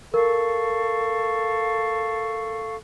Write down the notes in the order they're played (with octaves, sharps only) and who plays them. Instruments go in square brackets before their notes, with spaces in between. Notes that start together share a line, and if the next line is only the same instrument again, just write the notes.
[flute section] A4 F5 C#6 [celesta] A#4